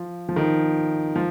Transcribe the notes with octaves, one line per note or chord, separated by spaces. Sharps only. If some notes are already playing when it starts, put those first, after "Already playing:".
Already playing: F3
F3
D#3
F3